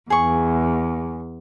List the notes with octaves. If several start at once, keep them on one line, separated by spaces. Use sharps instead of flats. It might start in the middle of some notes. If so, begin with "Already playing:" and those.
E2 G#4 C#6